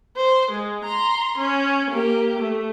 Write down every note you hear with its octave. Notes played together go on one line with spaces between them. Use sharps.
C5
G#3
A#5 C6
C#4
A#3 G4
A3